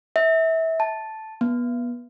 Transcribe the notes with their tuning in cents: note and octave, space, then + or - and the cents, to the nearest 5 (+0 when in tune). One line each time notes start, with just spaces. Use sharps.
E5 -25
A5 -5
B3 -25